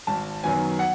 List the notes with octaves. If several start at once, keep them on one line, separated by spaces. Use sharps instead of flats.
G#1 A5
F#2 D#3 F#3 B3 G#5
F#5